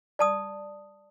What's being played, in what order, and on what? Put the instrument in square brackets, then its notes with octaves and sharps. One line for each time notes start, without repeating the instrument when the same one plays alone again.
[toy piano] D5 A5 D#6